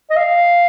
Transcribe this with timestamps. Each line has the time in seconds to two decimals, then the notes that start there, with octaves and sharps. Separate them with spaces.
0.10 D#5
0.16 F5